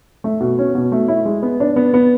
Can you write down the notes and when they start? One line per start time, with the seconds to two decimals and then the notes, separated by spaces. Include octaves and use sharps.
0.24 A3
0.40 B2
0.59 C#4
0.75 B2
0.92 A3
1.08 E4
1.25 G#3
1.42 B3
1.60 D4
1.76 B3
1.94 B3